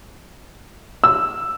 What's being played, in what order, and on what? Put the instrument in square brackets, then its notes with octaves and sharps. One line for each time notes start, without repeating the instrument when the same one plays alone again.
[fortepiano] E6